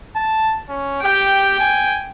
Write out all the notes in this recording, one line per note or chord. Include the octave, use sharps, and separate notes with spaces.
A5
C#4
G4 G5
G#5